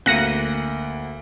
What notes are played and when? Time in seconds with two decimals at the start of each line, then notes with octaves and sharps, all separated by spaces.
0.06 D2 A#3 F#6 A#6 C#7 D#7